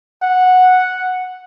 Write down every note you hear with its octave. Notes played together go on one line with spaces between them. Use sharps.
F#5